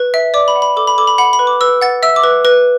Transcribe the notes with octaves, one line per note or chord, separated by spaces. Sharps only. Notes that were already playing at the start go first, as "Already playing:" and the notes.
Already playing: B4
E5
D5 D6
B5
F#5
B5
A4 D6
B5
A4 D6
B5
F#5 B5
B5
B4
D6
B4 E6
F#5 A6
E5 E6
D6
B4
B4